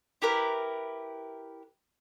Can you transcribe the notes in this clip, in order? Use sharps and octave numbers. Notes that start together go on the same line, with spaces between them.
E4 G4 A#4 B4